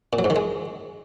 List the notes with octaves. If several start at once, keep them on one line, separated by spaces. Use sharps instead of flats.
A#2
F#3
G#2
D#3
G#3